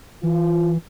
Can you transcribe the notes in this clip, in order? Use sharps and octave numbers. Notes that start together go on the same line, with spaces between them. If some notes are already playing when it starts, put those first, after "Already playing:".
E3 F4